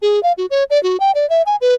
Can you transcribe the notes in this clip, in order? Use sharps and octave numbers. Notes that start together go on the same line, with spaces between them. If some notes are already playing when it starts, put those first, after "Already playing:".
G#4
F5
F#4
C#5
D5
F#4
G5
D5
E5
G#5
B4